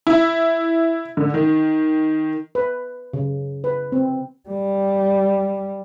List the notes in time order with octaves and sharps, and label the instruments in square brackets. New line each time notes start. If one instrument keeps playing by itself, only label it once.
[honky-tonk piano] E4
D3
D#3
[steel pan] B4
C#3
B4
C4
[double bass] G3